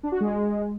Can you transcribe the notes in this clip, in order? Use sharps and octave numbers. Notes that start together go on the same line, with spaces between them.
D4
F#4
G#3